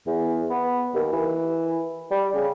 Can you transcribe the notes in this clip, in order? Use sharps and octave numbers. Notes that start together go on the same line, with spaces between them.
E2
B3
D#2
E3
G3
C#3